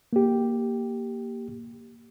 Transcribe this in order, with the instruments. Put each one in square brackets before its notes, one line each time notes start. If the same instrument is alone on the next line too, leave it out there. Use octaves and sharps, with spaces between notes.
[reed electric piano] A#3 G4